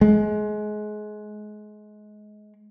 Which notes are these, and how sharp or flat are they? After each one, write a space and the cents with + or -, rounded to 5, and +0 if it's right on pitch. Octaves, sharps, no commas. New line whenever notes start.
G#3 +25